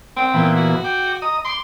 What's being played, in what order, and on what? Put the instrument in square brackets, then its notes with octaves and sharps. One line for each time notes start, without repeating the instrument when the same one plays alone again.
[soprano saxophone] C4
[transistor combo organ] A#2 E3 B3
[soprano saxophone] F#4
[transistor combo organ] G5 D6
D#5 A#5 D#6
[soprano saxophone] C6 [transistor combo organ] D6